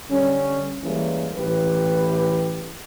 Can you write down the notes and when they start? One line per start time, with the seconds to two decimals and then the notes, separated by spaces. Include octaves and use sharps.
0.10 D3 G3 C#4
0.84 E3 G3 G#3 A#3 C#4
1.37 A1 E3 G4 B4